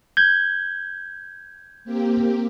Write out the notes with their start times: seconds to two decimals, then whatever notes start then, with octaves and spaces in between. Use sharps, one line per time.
0.17 G6 G#6
1.85 A#3 C4 G4